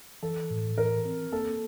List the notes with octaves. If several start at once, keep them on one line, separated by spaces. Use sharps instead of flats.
E3 A4
A2
E3 A#4
C4
A#3 A4